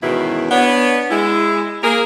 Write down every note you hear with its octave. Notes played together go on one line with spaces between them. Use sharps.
E2 G#2 B2 D#3 C#4 E4
B3 D4 C#5
G#3 E4
A#3 G#4 A#4